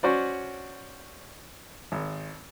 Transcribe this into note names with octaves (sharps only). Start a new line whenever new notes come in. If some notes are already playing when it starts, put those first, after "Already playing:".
C#4 F#4 C5 D5
G#1